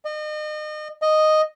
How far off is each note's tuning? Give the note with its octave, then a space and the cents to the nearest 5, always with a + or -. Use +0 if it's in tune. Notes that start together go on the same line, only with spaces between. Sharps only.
D#5 -35
D#5 -5